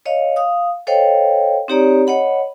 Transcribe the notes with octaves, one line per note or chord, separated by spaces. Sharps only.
C#5 D#5 F5
F5 D#6
A4 C5 C#5 D#5 F5 G5
C4 D#4 G4 C#5 D5 A#5
C#5 D#5 F#5 B5